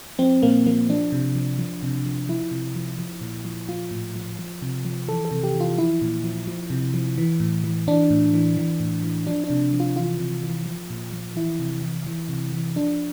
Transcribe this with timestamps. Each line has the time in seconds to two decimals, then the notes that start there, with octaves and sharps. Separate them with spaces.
0.19 F3 C4
0.43 A#2 A#3
0.66 F3 A#3
0.89 F3 D4
1.12 C3
1.35 F3
1.58 F3
1.83 C3
2.06 F3
2.29 F3 E4
2.51 C3
2.76 F3
2.99 F3
3.21 A#2
3.45 F3
3.69 F3 F4
3.91 A2
4.15 F3
4.39 F3
4.62 C3
4.85 F3
5.08 E3 A4
5.25 A4
5.31 C3
5.43 G4
5.55 E3
5.60 F4
5.78 F3 E4
6.02 A#2
6.24 F3
6.47 F3
6.70 C3
6.94 F3
7.18 E3
7.40 A2
7.64 E3
7.88 E3 D4
8.10 A2
8.34 E3
8.57 E3
8.80 A2
9.03 E3
9.27 F3 D4
9.44 D4
9.50 C3
9.73 F3
9.80 F4
9.96 E3 F4
10.19 C3
10.43 E3
10.66 F3
10.90 A#2
11.12 F3
11.36 E3 E4
11.59 C3
11.82 E3
12.06 E3
12.29 C3
12.53 E3
12.76 F3 D4